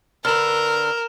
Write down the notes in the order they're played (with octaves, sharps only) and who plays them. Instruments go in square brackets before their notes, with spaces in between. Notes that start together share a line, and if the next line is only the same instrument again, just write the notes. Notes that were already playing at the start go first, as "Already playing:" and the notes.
[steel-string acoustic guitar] D3 B4 [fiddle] A#4 [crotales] F6 E7 F7